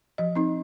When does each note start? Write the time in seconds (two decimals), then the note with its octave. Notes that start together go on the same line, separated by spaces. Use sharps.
0.18 F3 D#5
0.35 C4 D#4